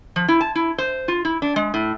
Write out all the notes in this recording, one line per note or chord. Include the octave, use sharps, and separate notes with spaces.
F3
E4
A5
E4
C5
F4
E4
D4
G#3
A2